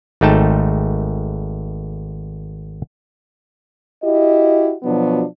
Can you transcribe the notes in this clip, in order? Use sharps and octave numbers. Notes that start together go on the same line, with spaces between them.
G#1 A3 D#4 G5 A5
E4 F#4 G4 D#5
B2 F3 F#3 B3 D4